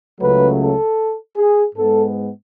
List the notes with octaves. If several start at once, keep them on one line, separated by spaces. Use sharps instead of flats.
C#2 C#3 F#3 A3 B4
A4
G#4
G#2 G#3 B3 A4